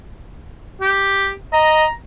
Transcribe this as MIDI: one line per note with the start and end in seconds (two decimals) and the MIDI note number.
0.81 1.33 67
1.53 1.85 75
1.53 1.91 82